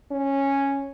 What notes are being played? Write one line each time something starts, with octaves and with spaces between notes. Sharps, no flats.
C#4